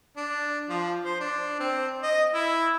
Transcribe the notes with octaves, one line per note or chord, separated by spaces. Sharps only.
D4
F3
C5
D4
C4
D#5
E4